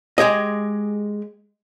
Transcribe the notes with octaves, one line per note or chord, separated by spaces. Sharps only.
G#3 G4 G#4 D#5